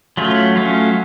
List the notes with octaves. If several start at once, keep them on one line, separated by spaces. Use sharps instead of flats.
F#3 A3 C#4 F4
F#3 A3 C#4 F4